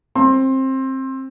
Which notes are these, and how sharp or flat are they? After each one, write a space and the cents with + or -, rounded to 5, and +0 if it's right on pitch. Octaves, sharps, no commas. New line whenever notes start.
C4 +20 C6 +25